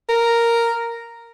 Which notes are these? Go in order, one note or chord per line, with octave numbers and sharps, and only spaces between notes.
A#4